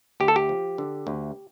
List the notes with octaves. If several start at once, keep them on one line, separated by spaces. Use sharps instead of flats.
D2 G4
A4
G4
F3
D3
D2